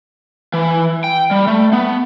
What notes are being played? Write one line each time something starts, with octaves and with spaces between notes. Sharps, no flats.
E3
G5
G3
A3
B3